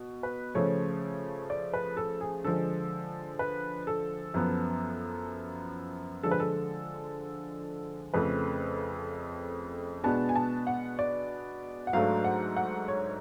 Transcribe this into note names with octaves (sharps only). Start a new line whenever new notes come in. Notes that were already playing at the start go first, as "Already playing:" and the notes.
Already playing: B2
B4
C#3 F3 A3 C#5
D5
B4
A4
G#4
D3 F3 G#3 A4
B4
A4
F#2 F3 B3
D3 F3 G#3 A4
B4
A4
F2 C#3 F3 A3 B4
B2 G#3 B3 D4 A5
G#5
A5
F#5
D5
F#5
G#2 F#3 A3 D4 F5
F#5
F#5
C#5